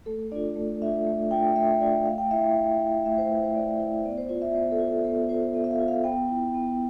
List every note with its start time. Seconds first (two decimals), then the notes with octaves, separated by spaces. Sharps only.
0.06 A3 A4
0.32 D4 F4 D5
0.56 A3
0.82 D4 F4 E5
1.07 A3
1.31 D4 F4 G5
1.56 A3 E5
1.81 D4 F4 D5
2.05 A3 F5
2.18 G5
2.31 E4 E5
2.43 G5
2.55 A3 G5
2.80 E4
3.05 A3 E5
3.18 C5
3.30 E4 B4
3.43 C5
3.55 A3 D5
3.79 E4 E5
4.05 B3 D5
4.17 C5
4.29 F4 C5
4.42 E5
4.54 B3 C5
4.71 A4
4.79 F4
4.88 A4
5.04 B3 A4
5.29 F4 C5
5.54 B3 E5
5.64 E5
5.71 F5
5.80 F4
5.88 F5
6.04 B3 G5
6.29 E4
6.54 B3